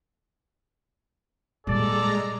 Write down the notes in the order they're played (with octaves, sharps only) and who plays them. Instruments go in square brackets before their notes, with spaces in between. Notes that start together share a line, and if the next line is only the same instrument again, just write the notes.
[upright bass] A#2 A#3 [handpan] G3 [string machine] G#3 A#5 [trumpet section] A4 D5